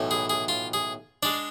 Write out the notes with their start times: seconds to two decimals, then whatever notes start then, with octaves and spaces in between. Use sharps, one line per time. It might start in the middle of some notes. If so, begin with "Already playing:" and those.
Already playing: B1 A2 E3
0.11 G#4
0.30 G#4
0.48 F4
0.73 G#4
1.23 G#3 D4 D5